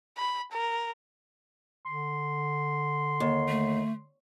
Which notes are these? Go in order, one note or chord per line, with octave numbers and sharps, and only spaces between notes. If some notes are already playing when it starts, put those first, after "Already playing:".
B5
A#4
D3 C6
D#2
A3